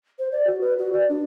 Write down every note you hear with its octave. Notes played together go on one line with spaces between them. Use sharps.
C5
D5
F#4
B4
F#4
D5
D4